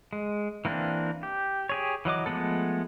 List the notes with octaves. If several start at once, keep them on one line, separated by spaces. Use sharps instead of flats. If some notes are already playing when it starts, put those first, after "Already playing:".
G#3
E3 A#3 C4 D4
G4
G4 G#4 C#5
E3 F#3 D#5 D6
F3 G#3 A3 B3 A4